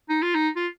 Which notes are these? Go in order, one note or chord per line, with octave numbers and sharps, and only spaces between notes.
D#4
F4
D#4
F4